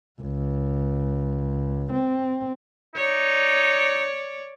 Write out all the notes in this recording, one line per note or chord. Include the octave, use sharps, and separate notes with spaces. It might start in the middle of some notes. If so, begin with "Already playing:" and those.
C#2
C4
D#4 C#5 D5